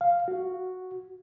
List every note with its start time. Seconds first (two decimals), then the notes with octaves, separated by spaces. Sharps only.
0.01 F5
0.28 F#4